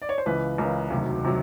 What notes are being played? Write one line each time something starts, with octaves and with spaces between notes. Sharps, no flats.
D5
C#5
C5
C#2 C#3 E3 B4
C#2 C#3 E3 A#4
E1 D2 C3 D#3 F#3
C3 D#3 F#3